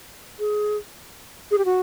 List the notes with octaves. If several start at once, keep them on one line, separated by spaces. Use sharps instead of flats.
G#4
G#4
G4
F#4